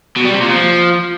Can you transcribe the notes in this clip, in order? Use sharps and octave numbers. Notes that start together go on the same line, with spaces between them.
B2
G3
C3
A#2
F3